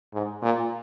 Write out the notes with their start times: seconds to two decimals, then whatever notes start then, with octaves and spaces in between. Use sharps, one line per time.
0.13 G#2
0.42 A#2